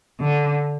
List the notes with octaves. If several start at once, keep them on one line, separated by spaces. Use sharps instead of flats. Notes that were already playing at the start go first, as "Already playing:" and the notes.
D3